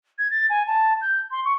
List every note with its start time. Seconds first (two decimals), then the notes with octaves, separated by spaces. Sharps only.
0.18 G#6
0.31 A6
0.50 G#5
0.67 A5
1.01 G6
1.31 C6
1.45 C#6